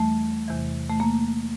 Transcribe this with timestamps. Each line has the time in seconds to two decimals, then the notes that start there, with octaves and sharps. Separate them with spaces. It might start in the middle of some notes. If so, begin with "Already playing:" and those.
Already playing: E2 E3 G3 A3
0.48 E2 C3 E3
0.90 A3
1.00 A#3